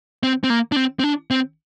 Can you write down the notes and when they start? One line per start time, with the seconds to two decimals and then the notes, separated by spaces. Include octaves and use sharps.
0.23 C4
0.44 C4
0.50 A#3
0.72 D4
0.76 C4
0.99 C4
1.04 D4
1.31 C4